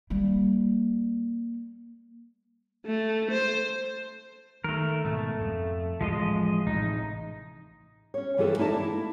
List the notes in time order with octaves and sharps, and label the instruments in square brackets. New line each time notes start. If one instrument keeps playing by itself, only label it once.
[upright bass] G3 A#3
[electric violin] A3
C5
[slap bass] D#3 [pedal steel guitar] A3 A#4
[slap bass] G#2 B2 [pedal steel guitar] A3
[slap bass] F2
[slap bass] A1 [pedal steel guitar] F3 G#3 D#5
[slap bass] A1 A2 C3 [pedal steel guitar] D#4
[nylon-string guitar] C#4 C#5
G2 E3 F4 G#4 A4 B4
A3 D#4 E4 D5 E5 A5
A#3 E4